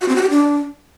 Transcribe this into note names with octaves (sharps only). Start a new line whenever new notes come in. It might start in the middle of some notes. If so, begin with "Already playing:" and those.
F#4
C4
F#4
G4
D4